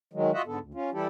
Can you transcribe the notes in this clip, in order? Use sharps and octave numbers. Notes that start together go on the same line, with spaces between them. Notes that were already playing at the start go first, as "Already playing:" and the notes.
D#3 F#3 G#3
F4 F#4 D#5 E5 F#5
G#2 D3 B3 A4
D2
C#4 F4
E3 G3 E4 G4 A4